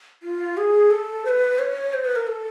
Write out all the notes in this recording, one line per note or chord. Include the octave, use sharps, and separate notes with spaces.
F4
G#4
A4
C5
B4
C#5
C5
B4
A#4
A4